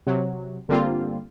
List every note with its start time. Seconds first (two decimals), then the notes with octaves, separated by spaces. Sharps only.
0.07 C3 F#3
0.68 G1 D3 G3 A#3 C4 F4